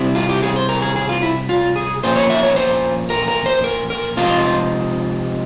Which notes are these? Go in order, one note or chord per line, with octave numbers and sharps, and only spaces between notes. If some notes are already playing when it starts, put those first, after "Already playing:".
Already playing: C3 G3 C4 E4
F4
G4
G#4
C5
A#4
G#4
G#4
F4
E4
F4
G#4
A#2 F3 A#3 C#4 C5
C#5
E5
C#5
C5
A#4
A#4
C5
A#4
A#4
C3 F3 G#3 F4